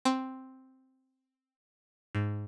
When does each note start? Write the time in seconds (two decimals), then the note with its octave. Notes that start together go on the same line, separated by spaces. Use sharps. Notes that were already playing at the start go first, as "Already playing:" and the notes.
0.05 C4
2.15 G#2